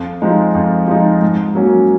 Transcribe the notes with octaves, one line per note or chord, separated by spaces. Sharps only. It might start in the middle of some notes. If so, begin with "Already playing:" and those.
Already playing: F2
F3 G#3 D#4
F2
F3 G#3 D#4
G#2
F#3 A#3 C#4